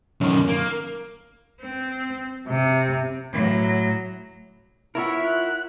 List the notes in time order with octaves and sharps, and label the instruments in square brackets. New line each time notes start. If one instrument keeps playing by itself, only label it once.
[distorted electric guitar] F#2 D#3
A#3
[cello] C4
C3
A2 F#3
[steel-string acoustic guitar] E4 F#5 [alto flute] F4 [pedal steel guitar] A#4 C#5 E5
[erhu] F#6